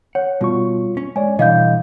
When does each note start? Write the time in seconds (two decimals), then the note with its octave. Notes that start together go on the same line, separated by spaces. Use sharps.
0.15 C#5 F#5
0.41 B2 G3 F4 C#6
0.97 C#4
1.16 G#3 C#5 D5 G#5
1.39 B2 D3 E3 G3 D#5 F5 G6